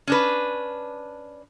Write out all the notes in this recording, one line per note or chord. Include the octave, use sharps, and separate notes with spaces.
C#4 D4 B4